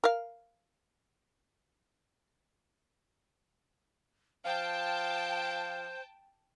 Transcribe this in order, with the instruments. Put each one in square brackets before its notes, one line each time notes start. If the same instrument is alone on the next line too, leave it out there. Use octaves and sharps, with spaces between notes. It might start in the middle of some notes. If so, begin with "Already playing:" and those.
[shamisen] A#4 F5
[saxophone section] F3 F5 [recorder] C5 [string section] G5 A5